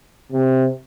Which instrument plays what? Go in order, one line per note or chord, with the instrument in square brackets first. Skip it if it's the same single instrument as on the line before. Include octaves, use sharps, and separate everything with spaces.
[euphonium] C3